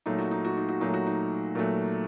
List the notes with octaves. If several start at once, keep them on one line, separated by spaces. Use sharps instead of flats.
A#2 F#3 A3 D#4
F#4
D#4
F#4
D#4
F#4
A#2 F#3 A3 D#4
F#4
D#4
A#2 F#3 A3